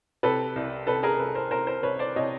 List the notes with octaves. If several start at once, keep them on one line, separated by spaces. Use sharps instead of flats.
C3 A4 B4
C2
C3 A4 B4
G#4 A#4
C2 A4 B4
A#4 C5
C3 A#4 C5
A#4 C5
C2 B4 C#5
C5 D5
C3 C#5 D#5